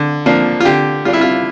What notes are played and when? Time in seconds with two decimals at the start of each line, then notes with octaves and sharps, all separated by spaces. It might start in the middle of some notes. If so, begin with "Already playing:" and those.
Already playing: D3
0.26 F3 A#3 D4
0.61 F4
0.65 D3 G4
1.05 G3 D4 F4
1.13 E4
1.21 F4